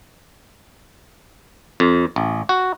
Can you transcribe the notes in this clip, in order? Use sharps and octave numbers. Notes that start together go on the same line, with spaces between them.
F2
A1
F#4